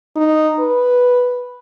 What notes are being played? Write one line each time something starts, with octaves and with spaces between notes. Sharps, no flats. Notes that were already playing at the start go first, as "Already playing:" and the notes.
D#4
B4